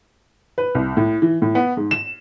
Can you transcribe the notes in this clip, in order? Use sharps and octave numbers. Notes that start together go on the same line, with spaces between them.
B4
C2
A2
E3
A2
B3
G#2
E7